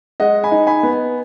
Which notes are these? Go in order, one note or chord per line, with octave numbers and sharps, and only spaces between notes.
G#3 D#5 F#5
G#5 B5
D#4
G#5 B5
B3